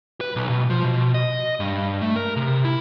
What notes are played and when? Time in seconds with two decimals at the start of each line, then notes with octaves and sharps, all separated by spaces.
0.21 B4
0.36 B1
0.50 B2
0.70 F3
0.84 B2
1.14 D#5
1.60 G2
2.02 A3
2.16 A#4
2.36 C3
2.65 E4